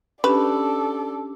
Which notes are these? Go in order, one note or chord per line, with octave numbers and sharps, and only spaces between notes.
C#4 D4 G4 A4 B4 D5